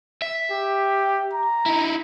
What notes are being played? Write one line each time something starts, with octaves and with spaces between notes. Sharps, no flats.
E5
G4
A#5
D#4 E4